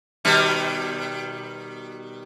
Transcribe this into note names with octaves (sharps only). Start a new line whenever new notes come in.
B2 D#3 G3